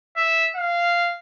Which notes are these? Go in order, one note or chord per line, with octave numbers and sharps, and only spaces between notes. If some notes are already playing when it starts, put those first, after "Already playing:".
E5
F5